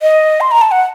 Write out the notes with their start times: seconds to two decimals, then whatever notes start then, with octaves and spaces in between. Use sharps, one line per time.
0.02 D#5
0.41 C6
0.51 A#5
0.61 A5
0.71 F#5